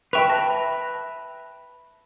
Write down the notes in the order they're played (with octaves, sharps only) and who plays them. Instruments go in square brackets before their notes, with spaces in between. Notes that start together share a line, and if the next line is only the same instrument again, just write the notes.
[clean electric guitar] B4 E5 [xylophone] G5 C#6 F7
[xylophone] A5 A#6